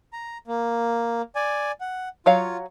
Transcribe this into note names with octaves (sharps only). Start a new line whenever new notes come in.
A#5
A#3
D5 G#5
F#5
F#3 F4 C#5 F5